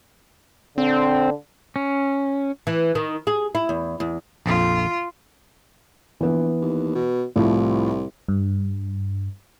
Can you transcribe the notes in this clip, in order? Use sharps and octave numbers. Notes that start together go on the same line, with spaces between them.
D3 C4
C#4
E3
D#3
G#4
E4
E2
E2
A#1 F2 F4
A#1 E3 B3
D#2
B2
C2 A2 F3
G2